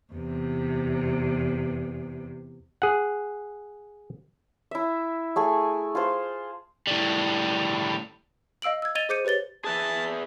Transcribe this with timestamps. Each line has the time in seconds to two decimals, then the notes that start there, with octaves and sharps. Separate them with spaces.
0.13 E2 C3
2.82 G#4 F#5
4.71 E4 E5
5.36 A3 G#4 G#5
5.95 F4 G#4 C5 F5
6.87 A2 G3
8.62 D#5 F5 E6 D7 F#7
8.82 E6 G#6
8.95 D#5 G#6 A6 D#7 F7 G7
9.09 G#4 C5 D6 G6 C#7 D#7
9.25 G4 B4 C#5 A6 G7
9.64 G#4 B4 E5 A5